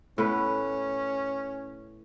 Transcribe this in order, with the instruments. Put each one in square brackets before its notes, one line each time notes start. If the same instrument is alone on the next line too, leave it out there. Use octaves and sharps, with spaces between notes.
[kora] A2 B3 B4 [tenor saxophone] C#4